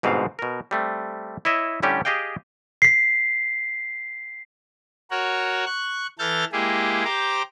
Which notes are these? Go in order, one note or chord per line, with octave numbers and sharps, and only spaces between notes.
G1 G#2 B2 C4 F5
B2 A#4
G3 A3 C4
E4 C#5 D#5 E5
A2 D3 G3 C#4 G4
G4 G#4 D#5 F5 G5
B6 C7
F#4 A#4 C#5 F#5
C#6 F#6
E3 A4 F6 G6 A6
G#3 A#3 E4 G4 G#4
G4 C5 A#5 D6